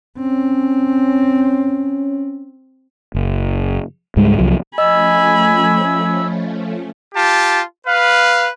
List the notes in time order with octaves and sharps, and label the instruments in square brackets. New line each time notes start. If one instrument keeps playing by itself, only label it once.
[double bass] C4 [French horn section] C#4
[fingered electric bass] F#1
C#2 G#2 G3 G#3
C2 F3 F#3
[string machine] F3 A3 C#4 [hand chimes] D#5 [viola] G#5 B5 [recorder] E6
[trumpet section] F4 G4 A5
B4 F5